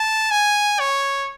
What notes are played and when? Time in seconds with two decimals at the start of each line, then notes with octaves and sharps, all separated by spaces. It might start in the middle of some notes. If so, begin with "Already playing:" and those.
Already playing: A5
0.31 G#5
0.80 C#5